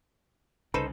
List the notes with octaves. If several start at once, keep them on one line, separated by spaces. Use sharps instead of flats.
C2 C#3 D#4 A4 B4 C5